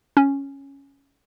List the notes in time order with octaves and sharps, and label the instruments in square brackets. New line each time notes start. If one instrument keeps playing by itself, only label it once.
[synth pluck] C#4